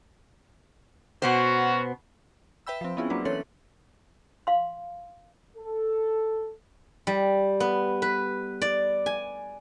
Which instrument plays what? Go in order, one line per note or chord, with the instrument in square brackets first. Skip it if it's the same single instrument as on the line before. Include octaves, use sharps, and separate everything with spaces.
[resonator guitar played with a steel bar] B2 B3 C5 [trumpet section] C#4 F#4
[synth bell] B4 E5 G5 B5 E6
F3 C4
B3 C#4 E4 F4 G#4
F#3 A#3 C4 D4 B4
E3 C#4 A4 C#5 C6 F#7
[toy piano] F5 C6
[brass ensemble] A4
[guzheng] G3
B3
B4
D5
G#5